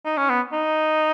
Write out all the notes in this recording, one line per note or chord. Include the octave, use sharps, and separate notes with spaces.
D#4
C#4
B3
D#4